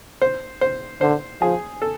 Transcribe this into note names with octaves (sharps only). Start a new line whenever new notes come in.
C5
C5
D3 C5
F3 G#4
A4